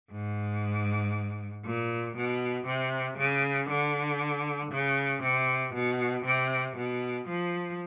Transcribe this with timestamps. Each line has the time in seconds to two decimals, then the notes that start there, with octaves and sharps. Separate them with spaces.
0.11 G#2
1.65 A#2
2.16 B2
2.67 C3
3.18 C#3
3.70 D3
4.72 C#3
5.23 C3
5.74 B2
6.25 C3
6.77 B2
7.28 F3